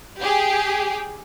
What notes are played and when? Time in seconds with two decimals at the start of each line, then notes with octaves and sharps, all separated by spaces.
0.20 G4 G#4